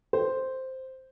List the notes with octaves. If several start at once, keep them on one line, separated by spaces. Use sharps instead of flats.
C5